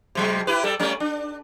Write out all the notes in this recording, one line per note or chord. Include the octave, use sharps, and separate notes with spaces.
C3 F#3 G#3
E4 G4 B4
G3 A4
G3 A3 C#4
D4